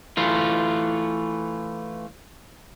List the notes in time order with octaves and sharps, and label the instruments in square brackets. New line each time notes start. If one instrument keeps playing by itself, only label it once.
[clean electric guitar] E3 A3 F4